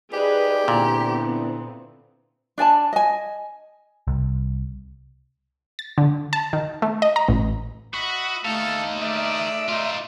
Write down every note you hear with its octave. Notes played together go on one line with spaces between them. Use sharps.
D#4 G4 G#4 B4 C5 D5
A#2 D3 B3 C4 E4
D4 D5 G#5 A5
D#5 G#5
C2
A6
D3
A5
D#3
A3
D#5
A#5
A1
F#4 D#5 E5 B5
A3 D#4 A4 F5
G#3 A3 D5 E5
D#4 F4